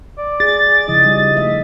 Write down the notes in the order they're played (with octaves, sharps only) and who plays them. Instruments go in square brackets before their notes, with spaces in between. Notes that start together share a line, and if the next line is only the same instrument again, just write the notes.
[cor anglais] D5
[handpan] G#4 [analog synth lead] A6
[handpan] C#3 F3 E4 [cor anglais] D#5
[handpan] F3 G3 D#4
A3 E5